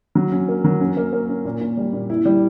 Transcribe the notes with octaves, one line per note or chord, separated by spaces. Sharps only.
F#3
C#4
A#3
F#3
C#4
A#3
A#3
C#4
A#2
A#2
G3
A#2
E4
G3